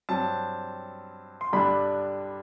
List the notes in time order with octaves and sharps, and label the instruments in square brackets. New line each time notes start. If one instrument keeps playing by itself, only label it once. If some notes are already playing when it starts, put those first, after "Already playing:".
[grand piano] G2 F#3 C4 A5
C6
G2 D3 G3 D4 B5